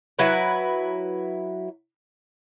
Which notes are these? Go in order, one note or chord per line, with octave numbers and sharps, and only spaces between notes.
F#3 E4 B4